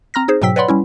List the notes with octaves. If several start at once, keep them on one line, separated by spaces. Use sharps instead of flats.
C4 A#5 F6 A#6
D#4 G#4 C5
G#2 B2 F#3 G5 E6 B6
B4 C#5 D5 F#5 B5 C6
G3 C#4 E4